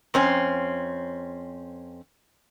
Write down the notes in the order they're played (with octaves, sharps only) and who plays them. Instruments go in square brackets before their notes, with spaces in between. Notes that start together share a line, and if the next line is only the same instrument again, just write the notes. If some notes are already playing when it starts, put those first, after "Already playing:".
[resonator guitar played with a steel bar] F2 C4 C#4